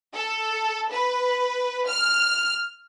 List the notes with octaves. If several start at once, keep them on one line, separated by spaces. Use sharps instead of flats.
A4
B4
F6